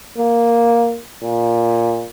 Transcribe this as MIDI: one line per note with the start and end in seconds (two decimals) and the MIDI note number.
0.18 0.98 58
1.23 2.07 46